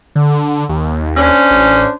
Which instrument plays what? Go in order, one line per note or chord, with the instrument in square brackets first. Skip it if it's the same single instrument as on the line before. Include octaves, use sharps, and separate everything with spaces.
[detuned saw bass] D3
D#2
[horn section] C#4 D4 C5
[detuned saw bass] A1